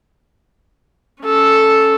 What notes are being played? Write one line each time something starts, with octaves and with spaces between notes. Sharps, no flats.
C#4 A4